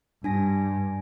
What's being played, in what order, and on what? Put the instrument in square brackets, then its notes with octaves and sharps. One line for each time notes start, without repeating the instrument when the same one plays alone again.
[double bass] G2 [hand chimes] D4 G#5 A#6